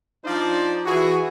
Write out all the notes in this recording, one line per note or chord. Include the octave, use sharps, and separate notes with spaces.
F3 D4 D#4 F4 C5 D5
E3 F#4 G#4